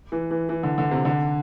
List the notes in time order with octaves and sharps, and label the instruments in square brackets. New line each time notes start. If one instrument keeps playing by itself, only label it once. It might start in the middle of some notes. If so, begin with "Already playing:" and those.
[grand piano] E3
E3
E3
D3
D3
C3
D3